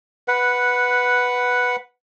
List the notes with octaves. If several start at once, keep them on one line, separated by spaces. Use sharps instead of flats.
B4 F#5